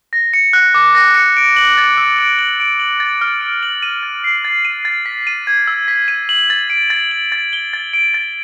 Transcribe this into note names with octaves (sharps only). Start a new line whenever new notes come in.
A#6
C#7
F#6
D6
A#6
C#7
D7
F#7
A6
E6
D7
F#7
D7
F#7
A6
F6
D7
F#7
D#7
A6
C7
A6
D#7
A6
B6
D#7
G#6
E6
B6
D#7
F#7
A6
D7
A6
F#7
A6
G7
A6
D7
A6